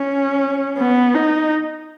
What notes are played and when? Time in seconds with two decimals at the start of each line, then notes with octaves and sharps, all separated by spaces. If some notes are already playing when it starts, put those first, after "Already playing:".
Already playing: C#4
0.78 B3
1.14 D#4